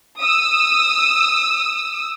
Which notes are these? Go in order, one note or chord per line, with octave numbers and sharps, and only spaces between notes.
D#6 E6